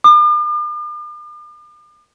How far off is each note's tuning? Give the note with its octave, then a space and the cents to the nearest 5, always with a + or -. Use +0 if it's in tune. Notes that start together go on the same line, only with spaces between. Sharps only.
D6 +45